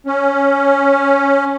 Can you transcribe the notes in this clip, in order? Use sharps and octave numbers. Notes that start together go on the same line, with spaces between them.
C#4